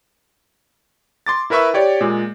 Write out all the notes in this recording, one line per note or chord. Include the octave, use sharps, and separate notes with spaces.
C6 D6 A6
E4 A#4 B4 E5 C#6
G4 C#5 D5
A#2 G#3